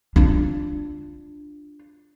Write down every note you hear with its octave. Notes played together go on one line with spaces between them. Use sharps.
D4 F4